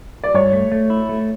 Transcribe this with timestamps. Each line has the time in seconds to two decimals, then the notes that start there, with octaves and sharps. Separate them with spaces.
0.24 D5
0.34 G2 C#5
0.53 A3
0.72 A3
0.90 E4
1.09 A3